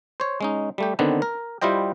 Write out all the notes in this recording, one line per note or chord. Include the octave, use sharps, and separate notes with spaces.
C5 C#5
G#3 C#4 D#4
G3 A3 G4
D3 D#3 B3 C4 D4
A#4
G3 E4 F4 C5 D#5 G5